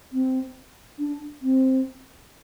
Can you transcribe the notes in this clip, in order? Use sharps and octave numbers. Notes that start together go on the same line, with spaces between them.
C4
D4
C4